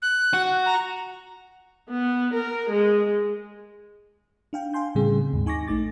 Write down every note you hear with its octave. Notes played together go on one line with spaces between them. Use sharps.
F#6
F#4
A#5
B3
A#4
G#3
D4 F5 G5
F5 G5 G#5 C6 G6
A2 C#3 E3 G3 C4 G#4
D#2 G#2
D#4 G#5 C#6 D6 A#6
A#1 A3 D#4 D6 A6